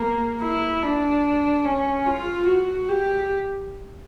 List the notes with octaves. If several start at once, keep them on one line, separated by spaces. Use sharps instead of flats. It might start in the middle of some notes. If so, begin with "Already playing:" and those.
Already playing: A#3
E4
D4
C#4
F4
F#4
G4